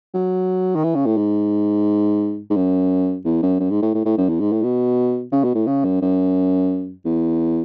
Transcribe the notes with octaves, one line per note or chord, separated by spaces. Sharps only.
F#3
D#3
E3
C#3
A2
G#2
G#2
F#2
E2
F#2
F#2
G#2
A2
A2
A2
F#2
E2
G#2
A2
B2
C#3
B2
A2
C#3
F#2
F#2
E2